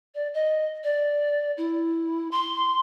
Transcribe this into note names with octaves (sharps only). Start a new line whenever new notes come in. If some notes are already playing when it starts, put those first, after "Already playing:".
D5
D#5
D5
E4
C6